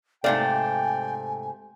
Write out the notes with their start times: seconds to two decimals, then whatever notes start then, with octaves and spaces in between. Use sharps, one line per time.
0.24 G#2 C3 A3 D5 F5 G5 G#5